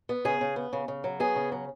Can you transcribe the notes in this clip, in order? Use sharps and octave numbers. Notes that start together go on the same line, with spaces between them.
B3
C#3 G#4
C#3
B3
C#3
C#3
F#3
B3 G#4
C#3
F#3